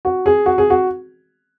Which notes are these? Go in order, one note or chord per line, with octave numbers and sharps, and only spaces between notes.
F#4
G#4
F#4
G#4
F#4